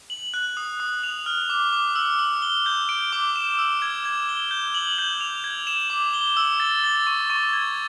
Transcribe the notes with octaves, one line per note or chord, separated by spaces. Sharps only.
F#7
F#6
D#6
D#6
F7
F6
D6
D6
E6
E6
G7
G6
D7
D6
E7
E6
G#6
G#6
G7
G6
F#7
G6
F7
G#6
E7
D6
G7
E6
A6
A6
C#6
C#6
G#6